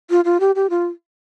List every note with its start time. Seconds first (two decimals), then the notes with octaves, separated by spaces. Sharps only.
0.10 F4
0.25 F4
0.40 G4
0.55 G4
0.70 F4